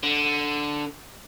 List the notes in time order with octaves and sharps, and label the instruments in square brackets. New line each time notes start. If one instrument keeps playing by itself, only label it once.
[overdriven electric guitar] D3